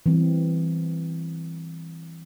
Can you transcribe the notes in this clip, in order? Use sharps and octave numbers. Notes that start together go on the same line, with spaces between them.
E3 G3 C4